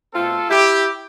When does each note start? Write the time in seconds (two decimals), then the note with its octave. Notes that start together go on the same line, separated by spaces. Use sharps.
0.13 B2 A3 C4 F4 A4
0.49 E4 G4